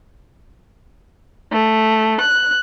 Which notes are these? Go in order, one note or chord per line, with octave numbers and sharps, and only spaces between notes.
A3
F#6